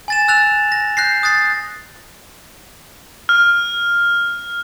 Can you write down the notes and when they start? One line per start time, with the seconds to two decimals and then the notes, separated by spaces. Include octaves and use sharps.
0.08 G#5 A6 E7
0.28 E6 F#6 A6 F7
0.72 A#6
0.97 F#6 G6 A#6 C7
1.23 D#6 F#6 A6 C7
3.29 F6